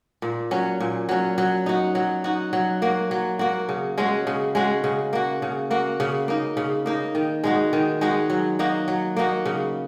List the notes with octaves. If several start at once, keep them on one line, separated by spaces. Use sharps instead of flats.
A#2
F#3 C#4
A#2
F#3 C#4
F#3
D#4 F#4
F#3
D#4 F#4
F#3
A#3 F#4
F#3
A#3 F#4
C#3
G#3 C#4 F#4
C#3
G#3 C#4 F#4
C#3
A#3 F#4
C#3
A#3 F#4
C#3
A#3 D#4
C#3
A#3 D#4
D#3
G#3 D#4 F#4
D#3
G#3 D#4 F#4
F#3
A#3 D#4 F#4
F#3
A#3 D#4 F#4
C#3